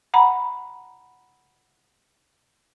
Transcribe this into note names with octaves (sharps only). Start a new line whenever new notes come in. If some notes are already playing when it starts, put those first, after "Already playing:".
F#5 A#5 B5